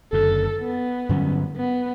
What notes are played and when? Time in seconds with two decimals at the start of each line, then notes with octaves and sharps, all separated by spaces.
0.12 F#1 F#2 D3 A4
0.60 B3
1.09 G2 D3 F#3 C#4
1.56 B3